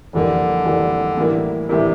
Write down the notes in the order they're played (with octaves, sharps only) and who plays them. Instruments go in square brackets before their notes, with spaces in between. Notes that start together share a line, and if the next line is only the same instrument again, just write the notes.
[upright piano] F1 F2 E3 G3 A#3 [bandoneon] D3
[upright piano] F1 F2 E3 G3 A#3
A2 E3 G3 A#3 E4
[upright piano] A2 E3 G3 A#3 E4 [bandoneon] C3